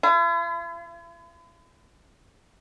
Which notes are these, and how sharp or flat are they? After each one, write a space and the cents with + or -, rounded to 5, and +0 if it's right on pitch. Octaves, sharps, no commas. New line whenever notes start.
E4 +45